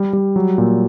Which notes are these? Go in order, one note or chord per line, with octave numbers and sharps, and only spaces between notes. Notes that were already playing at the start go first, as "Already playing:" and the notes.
Already playing: G3
G3
F#3
A#2